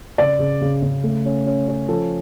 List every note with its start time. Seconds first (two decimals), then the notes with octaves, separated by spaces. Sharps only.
0.18 C#3 D5
0.39 C#3
0.61 C#3
0.82 C#3
1.04 A3
1.25 C#4
1.46 C#4
1.68 C#4
1.89 F3 A4